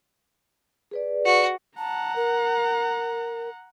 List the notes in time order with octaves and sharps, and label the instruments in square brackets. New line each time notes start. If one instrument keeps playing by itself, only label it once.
[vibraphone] G#4 B4 D5
[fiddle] F#4
[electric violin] F#5 A#5 [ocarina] A5
[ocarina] A#4